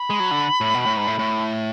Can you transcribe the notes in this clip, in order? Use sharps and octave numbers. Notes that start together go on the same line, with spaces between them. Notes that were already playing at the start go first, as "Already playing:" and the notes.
Already playing: B5
G#3
F#3
D3
A2
B2
A2
G#2
A2
A2